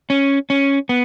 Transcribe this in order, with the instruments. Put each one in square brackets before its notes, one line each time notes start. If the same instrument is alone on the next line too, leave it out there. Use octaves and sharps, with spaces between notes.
[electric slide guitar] C#4
C#4
B3